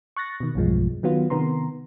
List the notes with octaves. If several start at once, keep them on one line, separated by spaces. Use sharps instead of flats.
C#6 F#6 A6 A#6
B2 D#3
B1 E2 G2 F3 G#3
D#3 F#3 B3 F4
C3 D#3 B3 A#5 C6